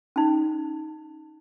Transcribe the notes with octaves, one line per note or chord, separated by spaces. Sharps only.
C#4 D#4